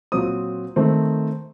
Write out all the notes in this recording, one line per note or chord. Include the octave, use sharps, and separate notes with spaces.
A#2 F#3 C4 D#6
D#3 A3 C4